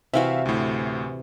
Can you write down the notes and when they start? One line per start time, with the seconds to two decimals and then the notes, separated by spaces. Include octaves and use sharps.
0.14 C3 E3 F#4 E5 F5
0.46 D2 A2